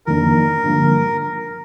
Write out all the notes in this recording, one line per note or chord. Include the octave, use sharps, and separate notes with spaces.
F2 D#3 A#3 D4 A#4
G2 D3 F3 A#3